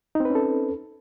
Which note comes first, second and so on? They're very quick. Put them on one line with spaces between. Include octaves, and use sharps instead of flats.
D#4 C4 B4 C#4 A4